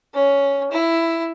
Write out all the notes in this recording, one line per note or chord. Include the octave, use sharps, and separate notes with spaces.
C#4
E4